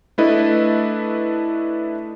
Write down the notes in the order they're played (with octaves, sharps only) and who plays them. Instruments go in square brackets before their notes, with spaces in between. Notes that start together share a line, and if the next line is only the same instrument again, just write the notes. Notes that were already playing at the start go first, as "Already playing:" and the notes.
[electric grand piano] A3 D4 E4 A4 B4 D#5